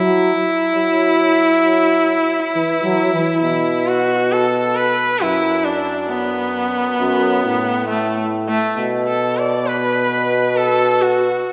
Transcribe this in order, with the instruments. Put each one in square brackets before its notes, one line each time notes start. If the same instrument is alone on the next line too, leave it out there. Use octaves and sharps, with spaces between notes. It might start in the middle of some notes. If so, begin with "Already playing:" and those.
Already playing: [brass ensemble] F#3 [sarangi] E4
[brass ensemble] F#3
E3
F#3
E3
[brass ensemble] B2 [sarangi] E4
[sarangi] F#4
A4
B4
[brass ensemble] F#2 [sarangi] E4
[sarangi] D4
B3
[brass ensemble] F#2
A2
[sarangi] A3
A3
[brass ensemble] B2
[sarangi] A4
D5
B4
A4
F#4